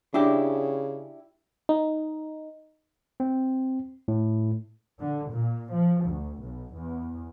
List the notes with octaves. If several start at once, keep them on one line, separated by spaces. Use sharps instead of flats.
C#3 D4 E4 G4
D#4
C4
A2
D3
A#2
F3
D2
B1
E2